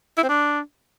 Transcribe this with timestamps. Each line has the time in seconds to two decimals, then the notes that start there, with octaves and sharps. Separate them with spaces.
0.18 E4
0.23 C4
0.29 D4